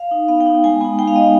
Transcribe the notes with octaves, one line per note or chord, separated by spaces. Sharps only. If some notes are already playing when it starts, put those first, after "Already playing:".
Already playing: F5
D#4
B3 F5
G5
D#4
G#3 G#5
B3 D#4 G#5
G#3 G5
F5
B3 D#4 D#5